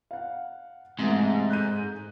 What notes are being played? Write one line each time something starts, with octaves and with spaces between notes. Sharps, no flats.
F5 F#5
G#2 C3 E3 A3
F#6 G6 D#7